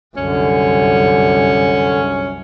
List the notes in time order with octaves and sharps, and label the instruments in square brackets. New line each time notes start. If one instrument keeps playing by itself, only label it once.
[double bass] C2 F#2 [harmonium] D3 [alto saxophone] C#4